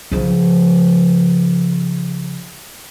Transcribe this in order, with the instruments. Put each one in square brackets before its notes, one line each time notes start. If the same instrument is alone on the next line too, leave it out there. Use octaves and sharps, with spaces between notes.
[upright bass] C#3 F3